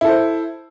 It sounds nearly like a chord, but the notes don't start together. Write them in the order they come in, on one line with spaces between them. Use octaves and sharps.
E4 A4 C5